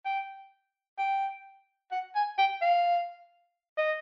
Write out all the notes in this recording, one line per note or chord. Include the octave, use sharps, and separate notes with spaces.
G5
G5
F#5
G#5
G5
F5
D#5